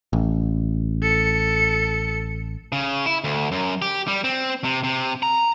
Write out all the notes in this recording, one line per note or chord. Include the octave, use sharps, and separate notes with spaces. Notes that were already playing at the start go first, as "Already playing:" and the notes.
A1
A4 C#7
C#3
E4
D2
F#2
G4
G3
C4
C3
C3
A#5